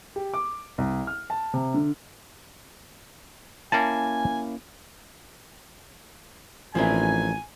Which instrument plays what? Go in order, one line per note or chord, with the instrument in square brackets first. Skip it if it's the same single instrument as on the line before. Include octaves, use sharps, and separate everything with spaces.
[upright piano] G4
D6
C2
F6
A5
C3
D3
[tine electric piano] A#3 C#4 E4 [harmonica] G#5 [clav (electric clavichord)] A5
[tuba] A1 [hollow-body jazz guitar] F3 F4 A#4 [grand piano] C4 D4 E5 [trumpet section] G#5